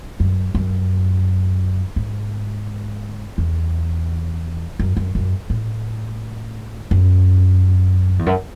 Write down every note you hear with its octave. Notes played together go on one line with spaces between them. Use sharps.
F#2
F#2
G#2
E2
F#2
F#2
F#2
A2
F#2
E2
F#2